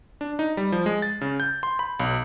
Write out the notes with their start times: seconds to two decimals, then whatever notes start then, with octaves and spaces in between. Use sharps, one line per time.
0.21 D4
0.39 D#4
0.57 G3
0.72 F3
0.86 G#3
1.02 A6
1.21 C#3
1.40 G6
1.63 C6
1.79 B5
2.00 B1